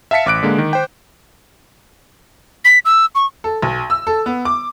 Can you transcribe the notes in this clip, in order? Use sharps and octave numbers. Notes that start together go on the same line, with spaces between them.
E5 F5 A5 B6 C#7
A1 D6 F#6 D7
D3 G#3 A#3
D#3
C5 G5
B6
E6
C#6
A4
B1
E6
A4
B3
D6